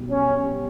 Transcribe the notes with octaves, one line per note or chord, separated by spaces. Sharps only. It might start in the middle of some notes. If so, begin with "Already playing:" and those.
Already playing: B1 B2 G3
C#4
B2 G3